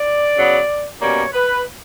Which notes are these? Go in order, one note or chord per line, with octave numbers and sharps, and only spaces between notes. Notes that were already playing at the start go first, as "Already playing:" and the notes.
Already playing: D5
C#3 F#3 B3
B2 G3 A#3 C#4 C#5
B4